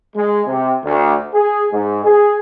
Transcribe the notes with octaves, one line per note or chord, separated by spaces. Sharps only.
G#3
C3
D2
G#4
G#2
G#4